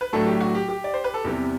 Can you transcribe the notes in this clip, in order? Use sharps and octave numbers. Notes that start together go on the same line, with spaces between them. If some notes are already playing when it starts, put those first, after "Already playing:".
B4
A2 F#3 A3 D4 A4
G4
F#4
G4
G4
D5
C5
B4
A4
E2 C3 G3 B3 G4